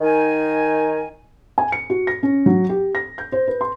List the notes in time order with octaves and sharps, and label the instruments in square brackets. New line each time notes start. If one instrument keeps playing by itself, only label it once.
[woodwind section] D#3 D#4 A#4 G#5
[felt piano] G#5
C#7
F#4
A#6
C#4
F#3
G4
A#6
G6
C5
B4
C6